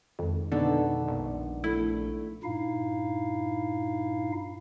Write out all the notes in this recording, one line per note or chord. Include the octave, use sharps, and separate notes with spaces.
F2 D#3 G#3
B2 D3 B3 D#4 A4 D5
A#1
A3 E4
G2 A#2 D#4 E4 F5